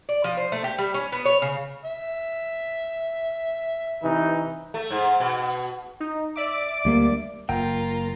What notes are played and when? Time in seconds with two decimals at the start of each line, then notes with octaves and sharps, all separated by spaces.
0.09 D5
0.24 F3
0.37 C5
0.52 A3
0.64 G4
0.78 G3
0.94 C#4
1.12 B3
1.25 C#5
1.42 C#3
1.85 E5
4.03 C3 E3 D#4
4.74 A3
4.90 G#2
5.20 B2
6.00 D#4
6.36 D5 E5 D6
6.85 D2 G3 A#3
7.49 F#1 A#3 F4 G5 A#5